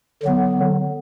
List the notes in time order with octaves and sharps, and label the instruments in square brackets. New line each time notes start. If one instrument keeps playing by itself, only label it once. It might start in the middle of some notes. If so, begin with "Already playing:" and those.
[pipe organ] D3 F#3 B3